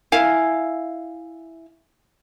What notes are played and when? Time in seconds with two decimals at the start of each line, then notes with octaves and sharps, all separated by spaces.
0.12 E4 F5 G#5